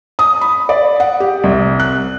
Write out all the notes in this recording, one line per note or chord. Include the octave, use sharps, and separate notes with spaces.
D#6
B5
D5
F#5
G4
C2
F#6